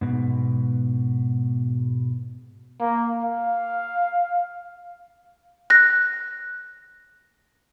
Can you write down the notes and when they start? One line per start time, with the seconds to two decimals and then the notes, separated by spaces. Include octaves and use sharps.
0.01 G#2 B2
2.80 A#3
3.24 F5
5.70 F#6 A#6